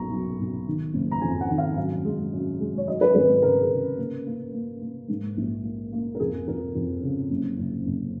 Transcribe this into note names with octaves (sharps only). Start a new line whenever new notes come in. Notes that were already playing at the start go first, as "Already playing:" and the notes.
Already playing: B1 A#3 A#5 C#6
B1
B1
D#3
F#1
A#5
F2 G#5
F#5
D#3
F5
F#2 F5
G#3
F#2
G#3
C#5
F#3 D#5
B4
G#1 B4
A#4
C#3 A#4
G#4
C#3
A#3
A#3
A#3
A#3
G#2
A#1
A#3
A#3
A#4
F2 G#4
F2 A#4
F2
C#3
F#1
F#1
F#1